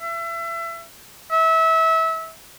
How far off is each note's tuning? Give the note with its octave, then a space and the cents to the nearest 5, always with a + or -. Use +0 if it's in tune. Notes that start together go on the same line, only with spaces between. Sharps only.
E5 +30
E5 -25